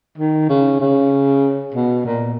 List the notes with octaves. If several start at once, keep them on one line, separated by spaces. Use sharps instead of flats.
D#3
C#3
C#3
B2
A#2